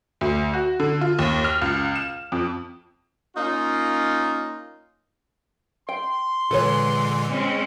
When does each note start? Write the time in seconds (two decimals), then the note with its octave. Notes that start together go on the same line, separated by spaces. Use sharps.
0.21 D2
0.53 F#4
0.80 D3
1.01 F4
1.19 D#2
1.44 F6
1.61 C#2
1.96 E7
2.32 F2
3.37 A#3 C#4 D#4 F4
5.89 G5 C6
6.51 A#2 D3 E3 G#3 A4 B4 C#5
7.30 G#3 C4 C#4